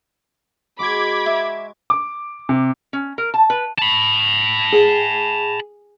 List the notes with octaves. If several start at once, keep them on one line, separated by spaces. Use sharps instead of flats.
G#3 F#4 B5 D6 G#6
E5
D6
C3
C#4
A#4
A5
B4
A5 B5
G#4